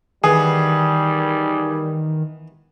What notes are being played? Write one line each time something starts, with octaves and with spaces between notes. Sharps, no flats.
D#3 E3 G3 B3 G#4